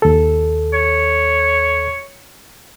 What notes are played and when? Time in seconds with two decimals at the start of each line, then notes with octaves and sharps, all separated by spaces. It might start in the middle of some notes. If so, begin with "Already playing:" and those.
0.02 D#2 A4
0.73 C#5